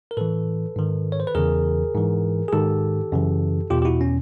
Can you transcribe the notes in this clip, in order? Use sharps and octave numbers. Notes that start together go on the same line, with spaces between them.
A#4
A2 E3 A4 B4
G#2 D#3
C#5
C5
B4
E2 C#3 E3 G#4 A#4
G#2 E3
G#4
G#2 D#3 G4 A4
F#2 C#3 E3
E2 B2 F4 G4
G4
E4 F#4
C#4